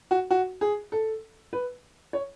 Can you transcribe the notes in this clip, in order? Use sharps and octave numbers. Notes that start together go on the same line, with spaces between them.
F#4
F#4
G#4
A4
B4
C#5